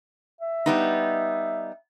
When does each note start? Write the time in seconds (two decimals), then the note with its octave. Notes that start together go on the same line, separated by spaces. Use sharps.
0.41 E5
0.66 G3 B3 D#4